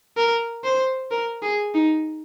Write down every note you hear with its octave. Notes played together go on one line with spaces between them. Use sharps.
A#4
C5
A#4
G#4
D#4